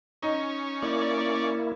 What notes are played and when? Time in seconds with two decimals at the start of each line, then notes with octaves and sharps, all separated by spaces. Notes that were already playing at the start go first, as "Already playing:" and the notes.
0.22 C#4 D#4
0.82 A#3 E4 D5